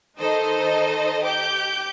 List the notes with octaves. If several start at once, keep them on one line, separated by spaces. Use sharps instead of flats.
D#3 D#4 A4 C5 D#5
G4 D6 G6